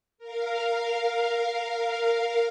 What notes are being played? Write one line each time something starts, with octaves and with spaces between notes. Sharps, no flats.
A#4 F5